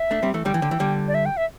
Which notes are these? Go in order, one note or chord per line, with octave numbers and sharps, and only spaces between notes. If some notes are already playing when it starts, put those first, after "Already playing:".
Already playing: E5
A3 D4
G3 C4
E3 A3
D3 G3 G5
E3
D3
E3
D3 G3
D5
E5
G5
E5